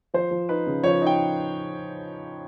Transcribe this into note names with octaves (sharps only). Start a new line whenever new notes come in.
F3 C5
F3
D#4 B4
C#3
F3 C#5
D#4 G5